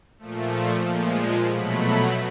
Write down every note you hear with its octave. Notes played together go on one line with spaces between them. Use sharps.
A#2 F3 A3
A#2 F3 G#3
B2 F#3 A3 B5